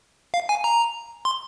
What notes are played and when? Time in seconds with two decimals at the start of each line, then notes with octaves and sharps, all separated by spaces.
0.34 F5
0.49 G#5
0.64 A#5
1.25 C6